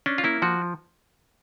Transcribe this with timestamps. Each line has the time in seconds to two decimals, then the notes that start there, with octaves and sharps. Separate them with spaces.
0.06 C#4 D4
0.18 F4
0.24 A#3 E4
0.42 F3 F#4